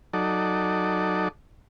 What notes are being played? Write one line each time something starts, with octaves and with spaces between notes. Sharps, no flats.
F#3 D#4 A4 D5